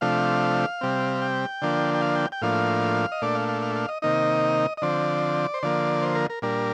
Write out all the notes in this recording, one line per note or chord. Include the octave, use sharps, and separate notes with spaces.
C3 F3 A3 D4 F5
C3 G3 C4
G5
D3 F3 A#3 D4
G5
F5
G5
G5
A2 F3 A#3 D4 F5
D#5
A#2 A3 D4 D5
F5
F5
F5
F5
D#5
C3 D#3 A#3 D#4 D#5
D#5
D3 F3 C4 D5
C5
D3 F3 A#3 D5
C5
A#4
A#4
A#2 G3 D4 A#4